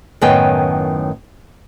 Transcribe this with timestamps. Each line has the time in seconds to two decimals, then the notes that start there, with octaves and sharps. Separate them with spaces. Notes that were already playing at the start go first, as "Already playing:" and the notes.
0.21 F#2 A2 D#3 B3 G5 G#5